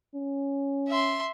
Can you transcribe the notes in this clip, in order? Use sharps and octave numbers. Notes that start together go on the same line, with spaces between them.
C#4
E5 C6